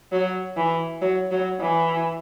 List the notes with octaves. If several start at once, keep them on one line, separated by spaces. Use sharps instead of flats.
F#3
E3
F#3
F#3
E3